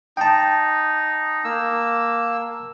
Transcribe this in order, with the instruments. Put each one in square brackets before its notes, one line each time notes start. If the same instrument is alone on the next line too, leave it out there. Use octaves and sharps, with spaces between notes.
[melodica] D#4 [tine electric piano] G5 A5
[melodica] A#3 E6